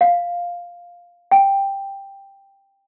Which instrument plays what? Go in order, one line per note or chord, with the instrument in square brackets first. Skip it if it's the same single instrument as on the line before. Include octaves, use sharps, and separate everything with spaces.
[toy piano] F5
G5